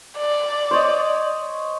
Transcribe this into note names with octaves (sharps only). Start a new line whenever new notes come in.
D5
C5 C#5 D#5